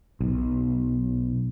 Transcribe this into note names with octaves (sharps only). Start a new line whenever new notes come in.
B1